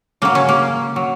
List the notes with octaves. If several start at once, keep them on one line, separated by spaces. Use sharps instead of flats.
C#3 F#3 A#3
C#4
A#3
F#3